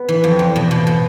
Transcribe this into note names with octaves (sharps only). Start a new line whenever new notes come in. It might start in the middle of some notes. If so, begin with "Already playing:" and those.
Already playing: B3
E3
F2
E2
B2
B2
B2